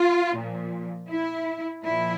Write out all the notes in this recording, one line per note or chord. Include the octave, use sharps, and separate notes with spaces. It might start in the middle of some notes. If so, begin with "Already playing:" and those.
Already playing: F4
A#2 F3
E4
A#2 F3 E4